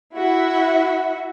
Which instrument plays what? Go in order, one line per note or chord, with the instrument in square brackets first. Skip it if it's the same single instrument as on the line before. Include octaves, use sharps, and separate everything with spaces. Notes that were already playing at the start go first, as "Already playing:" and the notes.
[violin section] E4 F#4 E5